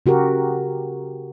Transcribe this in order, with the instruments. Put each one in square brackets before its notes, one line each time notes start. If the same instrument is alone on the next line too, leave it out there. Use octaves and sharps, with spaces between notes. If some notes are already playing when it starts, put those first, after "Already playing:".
[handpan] C#3 F#4 G4 A#4